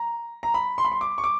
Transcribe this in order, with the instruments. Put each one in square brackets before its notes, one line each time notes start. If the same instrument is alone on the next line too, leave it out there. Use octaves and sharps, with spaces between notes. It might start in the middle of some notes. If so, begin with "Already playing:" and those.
Already playing: [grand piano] A#5
A#5
B5
C6
B5
C6
D6
C#6
D6